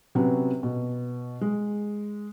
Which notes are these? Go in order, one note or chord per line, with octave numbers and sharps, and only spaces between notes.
C3 F#3 B3 C#4
B2
G#3